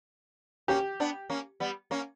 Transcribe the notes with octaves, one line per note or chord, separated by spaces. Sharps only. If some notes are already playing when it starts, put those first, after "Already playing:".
A#3 C#4 G4
B3 D4
A#3 C#4
G3 B3
A#3 C#4